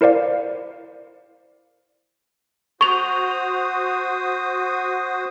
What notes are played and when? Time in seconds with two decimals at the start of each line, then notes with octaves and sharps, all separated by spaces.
0.01 E4 A#4 C5 D5 F5
2.81 F#4 C5 C#6 D#6 F7